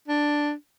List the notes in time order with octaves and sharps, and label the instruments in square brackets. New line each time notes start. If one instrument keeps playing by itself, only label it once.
[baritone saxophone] D4